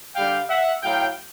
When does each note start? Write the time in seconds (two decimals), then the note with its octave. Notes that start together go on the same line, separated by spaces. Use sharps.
0.15 D3 G3 F5 G5
0.49 E5 F#5
0.82 A2 F#3 F5 G5